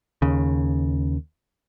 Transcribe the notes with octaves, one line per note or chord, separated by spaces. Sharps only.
D#2 C#3